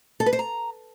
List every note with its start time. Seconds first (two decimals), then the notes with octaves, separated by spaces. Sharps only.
0.20 A4
0.26 B4
0.33 C5
0.39 A#5